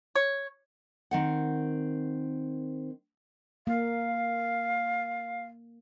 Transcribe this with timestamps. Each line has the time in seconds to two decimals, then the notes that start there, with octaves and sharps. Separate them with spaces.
0.15 C#5
1.11 D#3 C4 F#5
3.67 A#3 F5